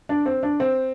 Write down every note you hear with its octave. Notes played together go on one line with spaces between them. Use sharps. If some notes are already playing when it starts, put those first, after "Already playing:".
D4
C4
D4
C4